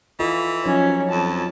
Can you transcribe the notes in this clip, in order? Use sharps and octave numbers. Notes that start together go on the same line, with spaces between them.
E3 F4 A4 D#5
F3 F#3 C#4 D#4
F2 A5